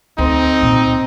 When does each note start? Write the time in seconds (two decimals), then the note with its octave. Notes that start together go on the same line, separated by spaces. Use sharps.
0.18 D2 C4 D#4
0.61 C#2 A#2